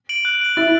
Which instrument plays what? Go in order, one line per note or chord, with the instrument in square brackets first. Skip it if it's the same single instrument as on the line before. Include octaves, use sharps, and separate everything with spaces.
[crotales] D7 F#7
F#6
D7 F#7
[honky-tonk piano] E4 [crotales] A6